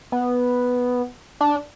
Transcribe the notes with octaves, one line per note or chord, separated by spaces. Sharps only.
B3
D4